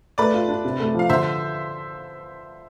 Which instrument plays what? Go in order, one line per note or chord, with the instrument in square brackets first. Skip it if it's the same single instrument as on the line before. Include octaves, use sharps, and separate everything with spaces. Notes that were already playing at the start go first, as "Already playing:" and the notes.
[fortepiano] A3 [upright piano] B4 D5
[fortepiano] F4
D4
C3
A3
[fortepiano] F3 [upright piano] F5
[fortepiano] D3 [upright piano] C5 E5